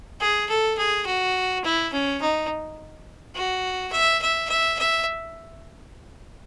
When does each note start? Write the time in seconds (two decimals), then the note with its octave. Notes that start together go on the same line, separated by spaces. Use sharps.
0.21 G#4
0.49 A4
0.78 G#4
1.07 F#4
1.65 E4
1.93 C#4
2.22 D#4
3.35 F#4
3.92 E5
4.22 E5
4.49 E5
4.79 E5